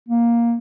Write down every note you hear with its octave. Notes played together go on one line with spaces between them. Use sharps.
A#3